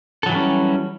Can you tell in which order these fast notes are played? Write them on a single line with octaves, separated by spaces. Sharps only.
A4 F#3 E3 G3 C#4